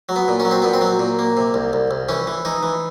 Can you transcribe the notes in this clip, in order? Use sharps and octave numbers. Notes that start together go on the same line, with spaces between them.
F#3
B3
A#2
C#4
F#3
C4
A#2 B3
C4
F#3
A#2
A#3
C3
C2
C2
C2
E3 C#4
E3
E3 D#4
E3